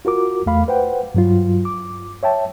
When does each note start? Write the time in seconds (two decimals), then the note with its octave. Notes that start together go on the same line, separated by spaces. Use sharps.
0.05 F4 F#4 A#4 D6
0.46 E2 A3 F5 B5
0.68 B4 C5 F#5 G5
1.15 G2 F#3 F4
1.65 D6
2.23 C#5 E5 G5 A5